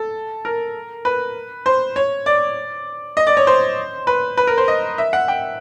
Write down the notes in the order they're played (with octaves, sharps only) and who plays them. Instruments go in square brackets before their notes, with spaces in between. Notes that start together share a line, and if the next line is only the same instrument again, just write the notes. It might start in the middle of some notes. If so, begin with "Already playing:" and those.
Already playing: [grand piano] A4
A#4
B4
C5
C#5
D5
D#5
D5
C#5
C5
B4
B4
A#4
C5
D#5
E5
F#5
G5